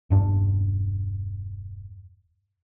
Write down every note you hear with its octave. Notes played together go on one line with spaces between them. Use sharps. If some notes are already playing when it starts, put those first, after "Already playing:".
E1 G2 D4